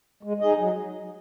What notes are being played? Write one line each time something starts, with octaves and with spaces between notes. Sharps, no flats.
G#3
D#4 G#4 D#5
F#3